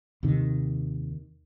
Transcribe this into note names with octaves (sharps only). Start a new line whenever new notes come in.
D#2 C3 D#3